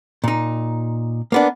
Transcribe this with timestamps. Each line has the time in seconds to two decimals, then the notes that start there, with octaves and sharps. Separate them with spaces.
0.24 A#2 D#4
1.32 A#3 B3 D4